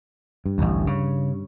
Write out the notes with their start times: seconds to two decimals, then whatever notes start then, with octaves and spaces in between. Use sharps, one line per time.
0.46 G2
0.58 A1 D2
0.87 C#3